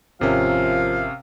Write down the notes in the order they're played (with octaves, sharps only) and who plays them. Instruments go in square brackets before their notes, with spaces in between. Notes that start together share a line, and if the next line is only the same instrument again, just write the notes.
[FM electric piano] G#1 A#4 E5 [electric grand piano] C3 C#4 [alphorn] F3 [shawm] F5